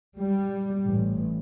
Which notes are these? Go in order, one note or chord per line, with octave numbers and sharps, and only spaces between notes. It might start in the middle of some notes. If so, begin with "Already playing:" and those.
G3
A1